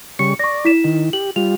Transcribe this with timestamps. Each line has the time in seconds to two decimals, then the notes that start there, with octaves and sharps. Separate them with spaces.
0.19 C#3 G3 C#6 C#7
0.39 D5 C#6 A#6
0.65 E4 B6 E7
0.84 D#3
1.13 G4 F#7
1.36 G3 F4 F7